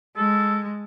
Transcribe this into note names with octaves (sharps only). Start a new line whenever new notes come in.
G#3 A4